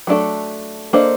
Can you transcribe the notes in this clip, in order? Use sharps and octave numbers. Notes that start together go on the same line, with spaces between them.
F#3 A3 D4 F#4 A4
A#3 D4 A4 C5 D#5